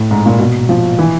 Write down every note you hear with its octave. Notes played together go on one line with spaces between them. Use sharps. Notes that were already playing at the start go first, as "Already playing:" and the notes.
Already playing: A2
G#2
A#2
B2
F3
E3